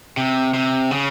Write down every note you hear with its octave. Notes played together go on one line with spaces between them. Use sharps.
C3
C3
C#3